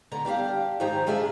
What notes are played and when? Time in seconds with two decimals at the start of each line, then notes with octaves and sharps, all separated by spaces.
0.12 D3 B3 A#5
0.25 G3 D4 G4 F5
0.80 G#2 D#3 F3 G4 G#5 A#5
1.06 C3 G#3 D4 F4 G#4 E5